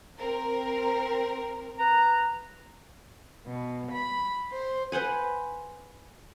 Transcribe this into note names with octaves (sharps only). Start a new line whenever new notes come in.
C4 A#4
B4 A#5
B2
B5
C5
B4 C5 F#5 G#5